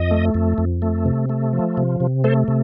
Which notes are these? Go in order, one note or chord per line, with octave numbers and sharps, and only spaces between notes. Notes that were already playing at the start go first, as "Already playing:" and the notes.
Already playing: F2 D#5
A3
F2
F2
A3
C3
A3
F3
C3
C3
A3 A4 C5
C3